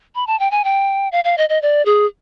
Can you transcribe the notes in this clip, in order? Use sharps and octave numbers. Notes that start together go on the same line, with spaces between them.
B5
A5
G5
G#5
G5
F5
F5
D#5
D#5
D5
G#4